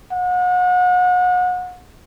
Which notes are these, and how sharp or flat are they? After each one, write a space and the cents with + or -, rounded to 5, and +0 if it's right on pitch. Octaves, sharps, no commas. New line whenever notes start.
F#5 -35